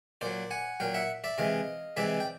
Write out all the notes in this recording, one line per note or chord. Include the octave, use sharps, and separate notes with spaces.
A#2 F#3 C5 D5
F#5 G#5
A#2 F#3 F5 G5
E5 F#5
D5 E5
C3 E3 G#3 D#5 F5
C3 E3 G#3 D5 E5
G5